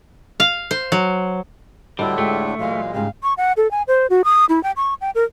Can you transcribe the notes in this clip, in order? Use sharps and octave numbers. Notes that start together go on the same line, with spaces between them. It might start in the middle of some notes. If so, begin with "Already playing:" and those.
F5
C5
F#3
A2 D3 G3 D4 E4 F#4 B4 D#5
G#3 A3 F4 G4
A#2 E3 F#3 G#3 F5
G#2 C#3 G3 F5
C#6
F#5
A4
G#5
C5
F#4
D#6
E4
G5
C#6
G5
A#4